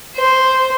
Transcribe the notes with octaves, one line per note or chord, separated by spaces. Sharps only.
C5